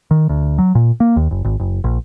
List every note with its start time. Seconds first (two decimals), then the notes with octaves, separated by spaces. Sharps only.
0.11 D#3
0.29 D2
0.58 F#3
0.75 A#2
1.00 A#3
1.16 D#2
1.31 F#1
1.45 G#1
1.60 F#1
1.84 A#1